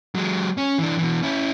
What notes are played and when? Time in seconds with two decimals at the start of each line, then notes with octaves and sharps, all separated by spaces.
0.15 F#3 G#3
0.57 C#4
0.79 E3 D4
0.99 B2 E3
1.22 C#4 E4